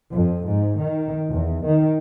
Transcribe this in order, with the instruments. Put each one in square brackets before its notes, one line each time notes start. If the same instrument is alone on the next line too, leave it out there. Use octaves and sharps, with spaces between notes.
[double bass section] F2
G#2
D#3
E2
D#3